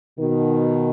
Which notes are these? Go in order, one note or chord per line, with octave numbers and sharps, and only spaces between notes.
B2 D#3